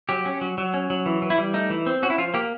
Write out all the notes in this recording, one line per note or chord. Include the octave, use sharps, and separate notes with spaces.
F#3 G4
C#4
F#3
F#3
C#4
F#3
E3
E3
E4
G3
A3 D#4
E3
C4
C#4 F#4
E4
F3 F4
A#3 G4